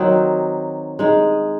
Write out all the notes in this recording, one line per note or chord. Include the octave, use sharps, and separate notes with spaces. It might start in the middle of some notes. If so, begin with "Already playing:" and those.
Already playing: D#3 F#3 C4 D#4
G#3 D#4 G#4